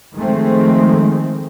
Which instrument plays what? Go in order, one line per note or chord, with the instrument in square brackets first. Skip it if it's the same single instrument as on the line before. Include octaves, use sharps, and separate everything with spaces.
[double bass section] D#3 F3 G#3 A3 C4